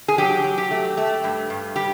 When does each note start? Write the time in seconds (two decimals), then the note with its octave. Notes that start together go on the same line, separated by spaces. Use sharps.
0.08 G#4
0.18 F#3 G4
0.44 F#3
0.58 G4
0.71 A3
0.97 A3
1.24 G2
1.50 G2
1.76 G3 G4